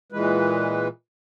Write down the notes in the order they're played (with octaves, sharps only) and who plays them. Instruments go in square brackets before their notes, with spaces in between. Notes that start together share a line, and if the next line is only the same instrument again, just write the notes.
[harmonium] A#2 E3 G#3 B4